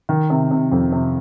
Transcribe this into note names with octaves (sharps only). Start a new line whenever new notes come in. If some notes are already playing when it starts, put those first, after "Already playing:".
D#3
C3
C3
F2
C3